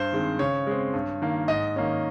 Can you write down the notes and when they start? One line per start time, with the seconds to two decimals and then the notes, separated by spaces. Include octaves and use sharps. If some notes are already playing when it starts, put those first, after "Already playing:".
Already playing: G2 C5
0.13 D#3 G#3 C4
0.39 C#3 C#5
0.67 G#3 C4
0.94 G2
1.22 D#3 A#3
1.48 G#2 D#5
1.76 D#3 A#3 C#4